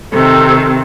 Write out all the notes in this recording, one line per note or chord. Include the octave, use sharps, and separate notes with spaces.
C3 D#3 C4 A4